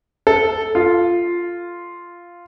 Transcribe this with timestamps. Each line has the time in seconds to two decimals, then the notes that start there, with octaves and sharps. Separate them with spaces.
0.27 A4
0.75 F4